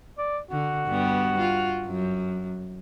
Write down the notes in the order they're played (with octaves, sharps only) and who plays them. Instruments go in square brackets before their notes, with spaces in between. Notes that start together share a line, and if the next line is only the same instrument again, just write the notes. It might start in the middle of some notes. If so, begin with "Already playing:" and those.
[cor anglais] D5
[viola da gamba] D3 [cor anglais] F#4
[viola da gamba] G2 G3 B3
F4
F#2